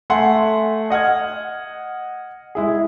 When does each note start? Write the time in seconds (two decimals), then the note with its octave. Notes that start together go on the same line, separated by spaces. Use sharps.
0.10 A3 E5 F#5 G#5 C6
0.90 D#5 F#5 F6 G#6
2.55 G#3 E4 G#4